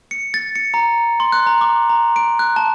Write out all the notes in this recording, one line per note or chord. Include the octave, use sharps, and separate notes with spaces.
C#7
A6
C#7
A#5
C6
F#6
A#5
D6
A#5
D7
F#6
A5